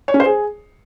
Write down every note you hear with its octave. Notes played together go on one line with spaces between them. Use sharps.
C#5
C#4
C5
G#4